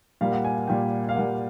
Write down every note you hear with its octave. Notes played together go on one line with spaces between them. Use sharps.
A#2 G3 A#3 F5
F#5
G#5
F#5
A#2 G3 A#3 G5
F5
A#2 G3 A#3 F#5